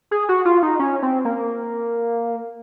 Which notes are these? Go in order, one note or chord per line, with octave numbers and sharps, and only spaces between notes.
G#4
F#4
F4
D#4
C#4
C4
A#3